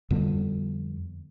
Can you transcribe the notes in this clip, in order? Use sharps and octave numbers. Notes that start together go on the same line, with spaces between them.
F2 D3 G3 B3